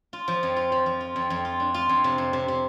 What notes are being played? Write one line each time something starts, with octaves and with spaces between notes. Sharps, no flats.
F4
F3
F2
F4
F3
F3
F4
F2
F2
F4
D4
F4
F2
C3
F2
C3
C3